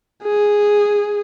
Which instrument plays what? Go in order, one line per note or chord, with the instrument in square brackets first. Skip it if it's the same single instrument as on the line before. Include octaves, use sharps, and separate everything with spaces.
[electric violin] G#4